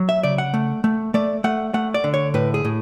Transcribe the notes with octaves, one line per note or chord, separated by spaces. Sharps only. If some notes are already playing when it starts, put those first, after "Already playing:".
Already playing: F#3
E5
C#3 D5
F#5
A3
A3
A3 D5
A3 F#5
A3 F#5
D5
D3
C#5
A2 B4
G#4
A2